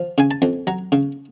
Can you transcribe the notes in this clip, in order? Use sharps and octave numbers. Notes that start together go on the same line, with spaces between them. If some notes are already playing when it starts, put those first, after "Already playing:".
Already playing: F3
C#3 G#5
A5
F2
F#3 A#5
C#3